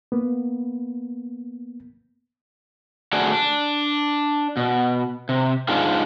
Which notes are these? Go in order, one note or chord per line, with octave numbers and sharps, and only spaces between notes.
A#3 B3
D3 A3 F#4 G#4 D5
D4
B2
C3
G#2 G#3 D4 F4